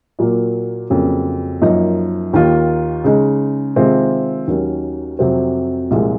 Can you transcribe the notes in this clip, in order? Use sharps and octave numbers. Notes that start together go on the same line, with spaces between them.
A#2 F#3 A#3
F2 C#3 F#3 A#3 C#4
F#2 F3 A#3 D#4
D#2 D#3 A#3 F4
C#3 G#3 D#4
C3 D#3 G#3 C4 F4
D#2 D#3 F#3 C#4
F2 C3 F#3 C4
C2 A#2 F3 G#3